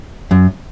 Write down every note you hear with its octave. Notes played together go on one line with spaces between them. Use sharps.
F#2